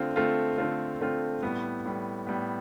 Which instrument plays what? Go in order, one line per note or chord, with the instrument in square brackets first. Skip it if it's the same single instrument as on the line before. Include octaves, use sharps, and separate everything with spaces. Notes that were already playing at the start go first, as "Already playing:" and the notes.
Already playing: [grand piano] D3 A3 C4 F4
D3 A3 C4 F4
D3 A3 C4 F4
D3 A3 C4 F4
A2 G3 B3
A2 G3 B3
A2 G3 B3